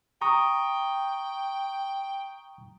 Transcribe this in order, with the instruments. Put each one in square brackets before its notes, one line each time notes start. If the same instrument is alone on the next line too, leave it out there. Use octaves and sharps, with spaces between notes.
[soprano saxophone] G5 [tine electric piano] A#5 C#6 D#6